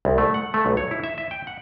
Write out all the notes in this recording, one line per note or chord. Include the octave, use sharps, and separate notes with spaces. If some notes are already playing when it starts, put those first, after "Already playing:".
C2
A3
F#5
A3
B1
C#5
E4
E5
E5
G5
F#5